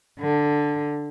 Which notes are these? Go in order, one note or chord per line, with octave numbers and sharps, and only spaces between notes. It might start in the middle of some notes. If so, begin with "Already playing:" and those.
D3